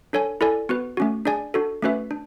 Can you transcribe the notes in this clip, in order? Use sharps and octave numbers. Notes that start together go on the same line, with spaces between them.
D4 A4 C#5 G#5
E4 A4 D5 G#5
B3 F#4 B4
A3 C#4 F#4
D4 G#4 D5 G#5
D4 F#4 A4
A3 C#4 F#4 B4 E5
D4